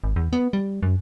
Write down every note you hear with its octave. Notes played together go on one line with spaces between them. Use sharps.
G#1
E2
B3
G3
F#2